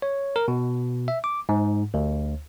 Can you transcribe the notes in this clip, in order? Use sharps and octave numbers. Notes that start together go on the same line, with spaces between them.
C#5
A#4
B2
E5
D6
G#2
D2